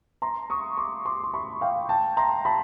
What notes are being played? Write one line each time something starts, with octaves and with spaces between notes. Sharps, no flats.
A#5 C6
C#6 D#6
C6 D6
C6 D6
C6
B5 C#6
F5 G5
G5 A5
A#5 C6
A5 B5